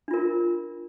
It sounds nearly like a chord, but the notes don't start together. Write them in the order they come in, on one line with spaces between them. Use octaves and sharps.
D4 F4 A#4